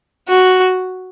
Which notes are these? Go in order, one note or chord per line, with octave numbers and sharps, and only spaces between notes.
F#4